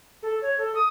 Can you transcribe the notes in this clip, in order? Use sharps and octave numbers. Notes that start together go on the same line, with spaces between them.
A4
C#5
A4
D#6